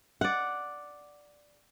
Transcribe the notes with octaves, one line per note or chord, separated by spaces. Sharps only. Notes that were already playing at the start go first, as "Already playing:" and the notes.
D5 F#5